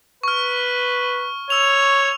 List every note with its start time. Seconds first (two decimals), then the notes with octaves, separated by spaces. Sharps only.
0.23 B4 C#6 F6
1.50 C#5 E6 F7